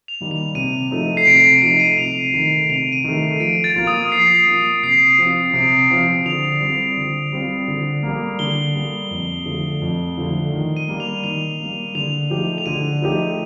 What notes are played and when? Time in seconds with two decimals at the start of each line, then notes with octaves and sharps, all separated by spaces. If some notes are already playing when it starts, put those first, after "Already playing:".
0.08 F7
0.21 D#3 G3 A#3
0.31 F7
0.55 C3 D#7
0.91 F3 A3 D#4
1.17 C7
1.27 C3 D7
1.44 D7
1.62 F3 A3 D#4 C7
1.80 D#7
1.98 C3 F7
2.34 D#3 A3
2.69 C3 F7
2.92 D#7
3.04 D#3 A3
3.40 F3 D7
3.64 A6
3.76 A#3 F4
3.87 D#6
4.12 F3 C7
4.47 A#3 F4
4.83 C3 C7
5.18 F3 C4 F4
5.54 C3 D7
5.90 F3 C4 F4
6.26 D3 F7
6.61 G3 C4 F4
6.97 D3
7.32 G3 C4 F4
7.68 D3
8.03 G3 A#3
8.39 D3 G7
8.75 G3 A#3
9.11 F2
9.46 D3 F3 A3
9.82 F2
10.18 D3 F3 A3
10.52 D#3
10.77 D#7
10.88 G3 A#3
11.00 F7
11.24 D#3 F7
11.60 G3 A#3
11.95 D3 F7
12.30 F3 A3 D#4 G4
12.58 F7
12.66 D3 D#7
13.02 F3 A3 D#4 G4